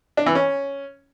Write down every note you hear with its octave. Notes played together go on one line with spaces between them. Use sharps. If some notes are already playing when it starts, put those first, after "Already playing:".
D4
E3
C#4